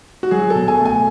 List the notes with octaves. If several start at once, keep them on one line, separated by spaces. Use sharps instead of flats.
F#4
F#3 G#4
B2 A4
G#5
A3
G#5